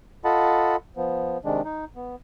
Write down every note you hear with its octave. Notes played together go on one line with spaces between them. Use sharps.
F4 A4 D#5 F#5 A5 B5
F3 B3
C3 D#3 G#3 D4
D#4
B3